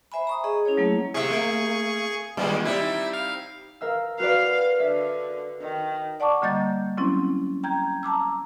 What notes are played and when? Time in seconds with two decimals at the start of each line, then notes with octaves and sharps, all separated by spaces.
0.12 C5 E5 G#5 B5
0.27 A#5 C#6 D#6
0.44 G#4 D#5
0.65 C#4 E4 G#4 C#5
0.77 F#3 A3 A#3 E4
1.14 C3 G#4 E5 C#6
1.30 A3
2.37 A#2 D#3 E3 G3 G#3
2.65 G3 C4 D#4 E4 E5
3.13 F5
3.81 A#4 F5 E6
4.20 F#4 B4 D5 F5
4.79 D3 E5
5.62 D#3
6.20 D5 F#5 A5 C#6 D6
6.42 D3 G3 A#3 D#5 G6 A6
6.97 F#3 C4 C#4 E4
7.63 G5 A#5 G6 G#6
8.03 A5 A#5 D6 E6